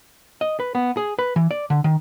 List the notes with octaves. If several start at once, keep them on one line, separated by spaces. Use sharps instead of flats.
D#5
B4
B3
G#4
B4
E3
D5
D3
D#3